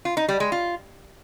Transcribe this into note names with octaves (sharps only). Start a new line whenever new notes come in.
F4
D#4
G3
G#3
F4